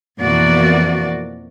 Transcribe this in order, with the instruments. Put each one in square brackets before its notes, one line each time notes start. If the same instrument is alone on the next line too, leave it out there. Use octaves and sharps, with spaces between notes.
[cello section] F2 B2 E3 A#3 F#4 D5